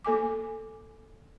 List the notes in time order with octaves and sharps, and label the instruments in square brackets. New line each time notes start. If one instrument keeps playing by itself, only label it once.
[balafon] A#3 A4 G#5 D6